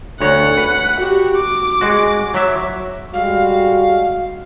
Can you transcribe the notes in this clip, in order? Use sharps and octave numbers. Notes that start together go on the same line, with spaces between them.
D2 C#5 F#5
B4
F#4 G4
D6
G#3 F#4
F#3 E5
G3 G#3 F#4 F5